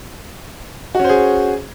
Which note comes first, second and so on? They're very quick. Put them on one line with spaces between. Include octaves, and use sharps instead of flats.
F#4 C#4 C5 G#4